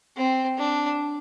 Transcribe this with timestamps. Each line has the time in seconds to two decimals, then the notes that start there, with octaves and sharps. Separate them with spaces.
0.16 C4
0.58 D4